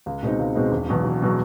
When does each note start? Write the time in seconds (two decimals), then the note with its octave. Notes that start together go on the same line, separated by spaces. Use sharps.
0.06 C#2
0.23 B2 G#3 C4 D#4
0.39 C#2
0.55 B2 G#3 C4 D#4
0.72 E1
0.88 E2 B2 F#3
1.04 E1
1.22 B2 F#3